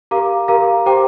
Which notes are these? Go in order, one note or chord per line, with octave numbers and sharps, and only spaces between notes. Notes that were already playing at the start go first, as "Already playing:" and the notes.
G4 A#4 F5 A#5 D6
G4 A#4 F5 A#5 D6
G4 C5 G5 A#5 D6